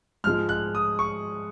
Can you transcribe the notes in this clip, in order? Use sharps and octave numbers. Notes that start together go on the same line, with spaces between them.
G#2 F3 G#3 F6
F#6
D#6
C#6